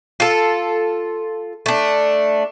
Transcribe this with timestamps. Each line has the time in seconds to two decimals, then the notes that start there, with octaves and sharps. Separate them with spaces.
0.20 F4 A4
1.66 A3 D4